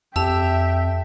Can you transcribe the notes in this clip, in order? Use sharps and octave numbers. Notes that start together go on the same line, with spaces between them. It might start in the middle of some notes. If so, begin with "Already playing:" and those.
F2 G4 E5 G5 A5 E6